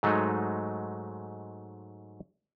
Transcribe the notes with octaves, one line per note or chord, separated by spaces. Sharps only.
G#2 F#3 G#3 A3 D#4